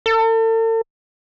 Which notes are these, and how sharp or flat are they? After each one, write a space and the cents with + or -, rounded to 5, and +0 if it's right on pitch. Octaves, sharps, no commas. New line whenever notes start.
A4 +40